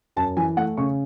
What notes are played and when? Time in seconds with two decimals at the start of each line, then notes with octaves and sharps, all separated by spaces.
0.16 F#2 A5
0.37 E3 G#5
0.57 A3 F#5
0.77 C#3 C#6